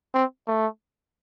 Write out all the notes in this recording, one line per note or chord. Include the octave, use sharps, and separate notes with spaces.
C4
A3